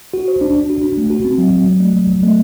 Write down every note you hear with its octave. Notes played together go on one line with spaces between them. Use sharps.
F#4
C5
D4
D4
F#4
D4
A3
F#4
C4
F#3
F#3
F#3
A3
F#3
F#3
A3